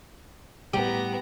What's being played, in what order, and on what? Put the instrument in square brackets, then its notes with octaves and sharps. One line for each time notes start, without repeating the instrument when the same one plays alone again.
[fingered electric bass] A2 G3 [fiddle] B3 A#5 [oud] G4